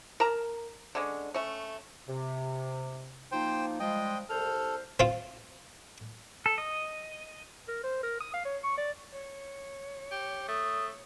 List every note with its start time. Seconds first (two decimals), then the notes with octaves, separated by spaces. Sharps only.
0.20 A#4 A5 A#5
0.95 D3 G#3 C#4
1.34 A3 C#4
2.07 C3
3.32 F3 A#3 D#4 C5 G5
3.80 F3 G3 G#3 D#5 G5
4.29 C2 A4 C5 F6
5.00 C4 F4
6.46 A4
6.58 D#5
7.68 A#4
7.83 C5
8.03 A#4
8.20 D#6
8.33 F5
8.45 C#5
8.63 C#6
8.77 D5
9.12 C#5
10.11 G4
10.48 A3 D#6